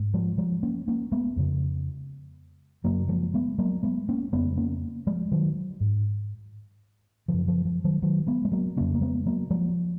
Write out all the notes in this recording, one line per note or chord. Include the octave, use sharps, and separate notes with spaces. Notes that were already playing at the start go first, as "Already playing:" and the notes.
Already playing: G#2
F3 G#3
F3 G#3
A#3 C#4
A#3 C#4
G#3 B3
F2 C#3
F#2 C#3 F#3 A#3
F3 G#3
G#3 B3
F#3 A#3
G#3 B3
A#3 C#4
F2 C#3 G#3 B3
A#3 C#4
F3 G#3
D#3 F#3
G#2
F#2 C#3 F3
F3
F3
D#3 F#3
D#3 F#3
G#3 B3
G#3
F#3 A#3
F2 C#3 A#3 C#4
A#3
G#3 B3
F#3 A#3
F3 G#3